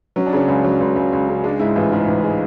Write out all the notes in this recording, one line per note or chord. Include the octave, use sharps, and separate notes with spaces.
F#3 C#4
D4
C#3 C#4
C#2
F#3
C#2
C#2
C#2
C#3
G#3 D4
G#2 E4
A1 F4
G#2 F4
A1
G#3